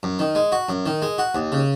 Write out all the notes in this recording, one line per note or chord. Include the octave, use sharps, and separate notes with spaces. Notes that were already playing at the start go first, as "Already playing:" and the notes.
F#2
D#3
G#3
F#4
F#2
D#3
G#3
F#4
D#2
C#3